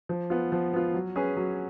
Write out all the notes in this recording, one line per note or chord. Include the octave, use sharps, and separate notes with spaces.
F3
B3 F4
F3
B3 F4
F#3
C#4 G#4 B4
F#3